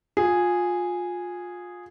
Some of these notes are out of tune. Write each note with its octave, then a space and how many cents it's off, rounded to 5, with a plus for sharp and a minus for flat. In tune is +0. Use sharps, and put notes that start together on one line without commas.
F4 +25 G#4 -5